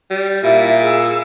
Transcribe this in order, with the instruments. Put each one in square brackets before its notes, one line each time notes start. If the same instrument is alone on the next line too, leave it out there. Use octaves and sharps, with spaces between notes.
[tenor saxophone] G3
[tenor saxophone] A#2 [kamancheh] E4 E5
[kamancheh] G#4 E6